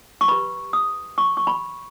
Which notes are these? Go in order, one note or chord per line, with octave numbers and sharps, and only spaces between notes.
C#6
G4 B4 B5
D#6
C#6
C#6
B5